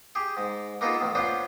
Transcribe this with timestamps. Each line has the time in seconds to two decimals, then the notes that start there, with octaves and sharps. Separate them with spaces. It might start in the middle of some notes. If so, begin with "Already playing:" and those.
0.15 G4 G#4
0.37 G#2
0.81 A#3 B3 D#4 F4 G#4 A4
1.02 A1 A2
1.15 B3 C#4 D4 F4 C5